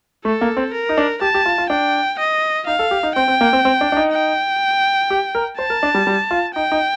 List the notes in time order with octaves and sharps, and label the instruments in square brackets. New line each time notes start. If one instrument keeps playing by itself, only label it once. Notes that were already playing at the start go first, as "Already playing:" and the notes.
[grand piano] A3 [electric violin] A4
[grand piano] A#3
C4
[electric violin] A#4
[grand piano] D#4
D4
[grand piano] G4 [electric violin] A5
[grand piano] G4
F4
F4
[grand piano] D4 [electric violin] G5
[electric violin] D#5
[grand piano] D#4 [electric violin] F5
[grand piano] A4
G4
D#4
[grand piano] C4 [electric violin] G5
[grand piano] C4
A#3
C4
C4
D4
D4
D#4
[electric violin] G5
[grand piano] G4
A#4
[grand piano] C5 [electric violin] A5
[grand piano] A#4
D4
G3
G3
F4
[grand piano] D#4 [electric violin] G5
[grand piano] D#4